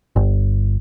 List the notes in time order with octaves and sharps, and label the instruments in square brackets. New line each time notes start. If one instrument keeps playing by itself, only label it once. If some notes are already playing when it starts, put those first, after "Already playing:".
[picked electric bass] G1